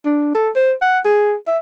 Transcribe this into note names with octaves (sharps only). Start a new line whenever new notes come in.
D4
A4
C5
F#5
G#4
E5